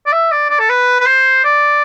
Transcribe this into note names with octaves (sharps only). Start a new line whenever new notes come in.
D5
E5
D5
D5
A4
B4
B4
C5
D5